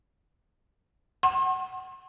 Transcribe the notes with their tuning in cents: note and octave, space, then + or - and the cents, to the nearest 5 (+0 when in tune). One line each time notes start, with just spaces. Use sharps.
F#5 +20 C6 +45